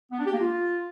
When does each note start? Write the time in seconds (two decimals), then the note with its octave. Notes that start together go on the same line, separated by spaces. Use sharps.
0.11 B3
0.19 D4
0.26 G4
0.33 A#3
0.40 F4